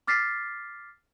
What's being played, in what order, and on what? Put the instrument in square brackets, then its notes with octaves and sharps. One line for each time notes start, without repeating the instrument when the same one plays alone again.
[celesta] D6 F6 A6 B6 C7